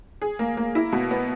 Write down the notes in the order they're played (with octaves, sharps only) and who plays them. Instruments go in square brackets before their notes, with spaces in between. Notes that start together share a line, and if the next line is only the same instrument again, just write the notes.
[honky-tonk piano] G#4
A#3
A#3
E4
B2
B3